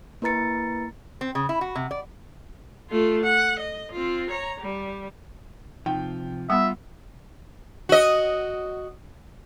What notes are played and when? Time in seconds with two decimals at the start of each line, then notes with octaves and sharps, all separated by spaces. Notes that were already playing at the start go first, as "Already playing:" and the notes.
0.22 A#3 E4 B4 A#5 A6 C#7
1.21 C4
1.35 C#3
1.49 E4
1.61 F#4
1.75 C3
1.91 D5
2.90 A3 F4
3.24 F#5
3.60 D#5
3.92 C4 F4
4.31 C#5 A#5
4.60 G3
5.86 C3 F3 D#4 G5
6.50 G3 B3 F4 E5 F#5 B5
7.89 F#4 D#5